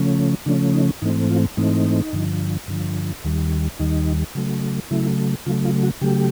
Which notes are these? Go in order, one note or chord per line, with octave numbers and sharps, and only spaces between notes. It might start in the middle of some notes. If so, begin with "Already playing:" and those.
Already playing: C#3 F3 A3 C#4
C#3 F3 A3 C#4 D4
D#4
G#2 E3 A3 C4 D#4
F4
G#2 E3 A3 C4 D#4
G2 D3 F3
G2 D3 F3
D#2 D#3 G3
D#2 D#3 G3 D#4
C#3 F#3 A3
C#3 F#3 A3 E4
C#3 F#3 A3 F4
F4
F#4
C#3 F#3 A3 G4